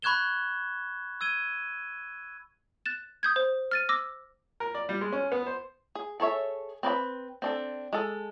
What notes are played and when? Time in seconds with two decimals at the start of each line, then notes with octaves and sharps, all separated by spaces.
0.02 B5 C#6 F#6 G#6 E7 G7
1.21 E6 G#6 D#7 G7
2.86 F#6 A6 E7
3.23 D#6 G6 G#6
3.36 C5
3.71 F6 A6 D#7
3.89 D6 E6 A#6
4.60 A#4
4.74 D5
4.89 G3
5.01 G#3
5.13 C#4
5.32 B3
5.46 C5
5.95 G#4
6.20 G#4 A4 C#5 E5
6.83 C4 B4 D5 B5
7.42 C4 D4 A4
7.93 G#3 A4